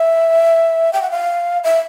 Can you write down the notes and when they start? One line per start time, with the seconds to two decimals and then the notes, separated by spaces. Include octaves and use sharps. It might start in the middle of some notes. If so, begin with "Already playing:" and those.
Already playing: E5
0.93 G5
1.02 F#5
1.11 F5
1.64 E5